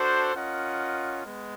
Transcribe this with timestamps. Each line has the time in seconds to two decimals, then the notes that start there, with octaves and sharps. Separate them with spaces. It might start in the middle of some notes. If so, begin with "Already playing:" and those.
Already playing: D4 F#4 A4 C5
0.33 C#4 F4 A#4 D#5 F#5
1.25 G#3 B3